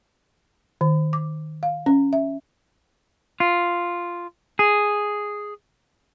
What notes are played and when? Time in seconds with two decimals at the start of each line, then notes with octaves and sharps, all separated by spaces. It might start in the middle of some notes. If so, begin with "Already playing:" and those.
0.81 D#3
1.13 D6
1.63 F5
1.86 C#4
2.13 E5
3.40 F4
4.59 G#4